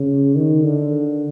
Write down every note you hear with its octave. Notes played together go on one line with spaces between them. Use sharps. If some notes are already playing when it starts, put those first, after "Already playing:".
Already playing: C#3
D#3
D3